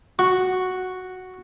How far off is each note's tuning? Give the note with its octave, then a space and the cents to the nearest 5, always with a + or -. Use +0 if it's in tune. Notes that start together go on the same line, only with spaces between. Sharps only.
F#4 +0 C#6 +0